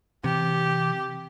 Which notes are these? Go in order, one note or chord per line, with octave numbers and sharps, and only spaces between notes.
C3 E3 G4